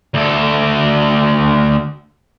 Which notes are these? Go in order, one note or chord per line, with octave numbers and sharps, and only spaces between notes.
D2 A4